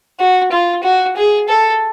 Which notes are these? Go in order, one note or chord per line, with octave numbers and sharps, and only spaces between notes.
F#4
F4
F#4
G#4
A4